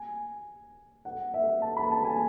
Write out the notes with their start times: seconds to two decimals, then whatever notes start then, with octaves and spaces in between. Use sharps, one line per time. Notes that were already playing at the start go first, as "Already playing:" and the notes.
Already playing: G#5
1.05 F#5
1.34 E5
1.62 A5
1.77 B5
1.91 A5
2.05 G#5